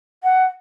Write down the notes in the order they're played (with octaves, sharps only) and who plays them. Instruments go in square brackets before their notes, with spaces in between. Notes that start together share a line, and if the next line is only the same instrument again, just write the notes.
[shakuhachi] F#5